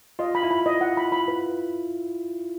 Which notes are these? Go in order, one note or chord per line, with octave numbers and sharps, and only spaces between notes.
F4 D#5
B5
E4
B5
D#5
F#5
B5
B5
B4